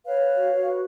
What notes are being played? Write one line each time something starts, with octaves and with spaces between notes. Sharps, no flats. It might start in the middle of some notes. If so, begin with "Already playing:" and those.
B4 C#5 F5
B4
F#4
F#4
B4